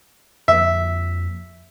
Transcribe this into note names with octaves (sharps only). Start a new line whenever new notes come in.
F2 F3 A#3 E5